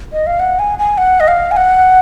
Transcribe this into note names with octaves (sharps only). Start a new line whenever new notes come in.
D#5
F5
F#5
G#5
G#5
F#5
D#5
F5
G#5
F#5